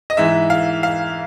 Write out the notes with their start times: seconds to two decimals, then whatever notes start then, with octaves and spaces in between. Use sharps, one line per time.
0.10 D#5
0.17 G#2 E3 E5
0.50 F5
0.83 F5